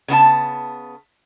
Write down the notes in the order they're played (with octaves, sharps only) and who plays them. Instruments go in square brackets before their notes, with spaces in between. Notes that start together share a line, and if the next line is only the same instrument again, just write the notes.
[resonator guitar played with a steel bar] C#3 B3 E4 A5